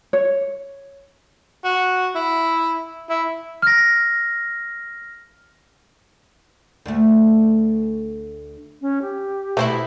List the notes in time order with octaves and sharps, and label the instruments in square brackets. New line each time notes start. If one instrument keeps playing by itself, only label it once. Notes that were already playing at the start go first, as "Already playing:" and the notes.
[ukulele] C#5
[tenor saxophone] F#4
E4
E4
[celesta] F6 A#6
[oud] D2 A3
[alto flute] C#4
G4
[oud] B2 E4 [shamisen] A3 C5